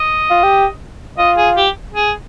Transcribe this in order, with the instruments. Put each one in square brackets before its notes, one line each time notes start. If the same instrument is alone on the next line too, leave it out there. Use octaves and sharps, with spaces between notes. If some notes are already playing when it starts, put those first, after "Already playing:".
Already playing: [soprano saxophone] D#5
[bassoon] F4
G4
[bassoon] F4 [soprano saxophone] D#5
[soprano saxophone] G#4
G4
G#4